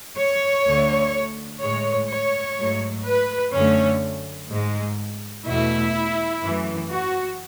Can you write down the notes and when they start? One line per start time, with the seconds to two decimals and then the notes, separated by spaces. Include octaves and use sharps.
0.16 C#5
0.66 D2 D3 A3
1.61 A2 G#3 C#5
2.09 C#5
2.58 G#2 F#3 A3
3.05 B4
3.53 F#2 D3 A3 C#4
4.51 G#2 G#3
5.47 E2 B2 A3 E4
6.43 F#2 E3 A3
6.91 F#4